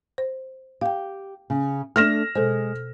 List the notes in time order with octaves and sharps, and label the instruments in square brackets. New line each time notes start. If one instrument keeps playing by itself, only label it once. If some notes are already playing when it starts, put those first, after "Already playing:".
[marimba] C5
[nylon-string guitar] G4 [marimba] F5 G5
[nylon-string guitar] C#3
[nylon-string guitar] A3 D4 [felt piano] F6 A#6 E7
[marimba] B2 A4 C5 [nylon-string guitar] G#3